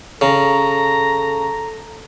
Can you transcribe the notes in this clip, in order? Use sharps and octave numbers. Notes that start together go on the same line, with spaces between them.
C#3 A4 A#5